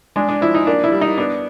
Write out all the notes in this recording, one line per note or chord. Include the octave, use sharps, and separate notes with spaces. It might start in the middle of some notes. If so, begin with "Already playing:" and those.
G#3 D4
D4
F3 E4
D#4
A#3 D4
E4
G3
D#4
B3 D4